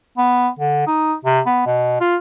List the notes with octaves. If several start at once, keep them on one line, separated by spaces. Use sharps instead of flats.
B3
D3
D#4
C3
B3
B2
F4